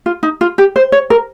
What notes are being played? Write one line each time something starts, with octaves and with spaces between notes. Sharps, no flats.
F4
D#4
F4
G4
C5
C#5
A#4